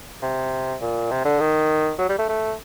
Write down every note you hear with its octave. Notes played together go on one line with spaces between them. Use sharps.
C3
A#2
C3
D3
D#3
F#3
G3
A3
A3